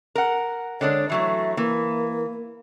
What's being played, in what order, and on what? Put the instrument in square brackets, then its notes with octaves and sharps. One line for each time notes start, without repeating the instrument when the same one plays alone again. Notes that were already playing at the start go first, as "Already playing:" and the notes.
[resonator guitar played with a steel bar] A#4 F#5
[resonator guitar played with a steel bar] D3 G#3 D4 [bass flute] C#5
[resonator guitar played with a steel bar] E3 F#3 A3 [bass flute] E5
[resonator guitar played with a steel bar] E3 [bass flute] A#3